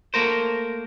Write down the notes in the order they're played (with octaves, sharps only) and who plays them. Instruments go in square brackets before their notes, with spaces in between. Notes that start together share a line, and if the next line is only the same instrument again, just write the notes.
[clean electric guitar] A3 A#3 A#4 C5